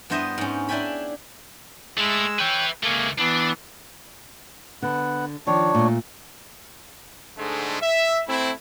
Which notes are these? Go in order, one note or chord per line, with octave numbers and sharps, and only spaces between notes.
G2 B3 E4 C5 D#5 E5
G#2 C#4
D4 E4 D5 G5 G#5 B5
G#3 A3 E4 E6
B4 C#5 E5 G5
C#2 A3 A#3 G#4
E3 B3 D4
D3 B3 F#5
D#3 F3 D4 C#5
A#2 A3
G#2 D3 G#3 A3
E5
A3 C4 E4